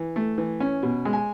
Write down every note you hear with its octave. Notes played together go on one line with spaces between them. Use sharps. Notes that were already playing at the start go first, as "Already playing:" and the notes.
Already playing: E3
A3
E3
C#4
B2
G#3
G#5